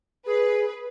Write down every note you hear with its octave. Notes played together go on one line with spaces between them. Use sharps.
G#4 B4